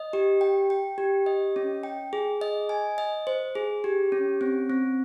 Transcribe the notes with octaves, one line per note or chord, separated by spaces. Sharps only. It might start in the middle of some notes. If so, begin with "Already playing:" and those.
Already playing: D#5
G4
G5
G5
G4
D#5
C#4
G5
G#4
D#5
G#5
D#5
C5
G#4
G4
C#4
C4
C4